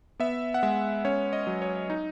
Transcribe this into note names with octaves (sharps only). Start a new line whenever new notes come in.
B3 E5
F#5
G#3 E5
C#4 C#5
D#5
F#3
C#5
D#4